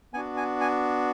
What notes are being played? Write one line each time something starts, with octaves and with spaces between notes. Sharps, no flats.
B3 D4 F#4 G#5
G#5
G#5